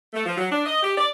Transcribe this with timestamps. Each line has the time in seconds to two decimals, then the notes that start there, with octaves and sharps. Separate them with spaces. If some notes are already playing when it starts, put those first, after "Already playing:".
0.14 A3
0.25 F3
0.37 F#3
0.50 D4
0.66 D#5
0.83 G4
0.97 D5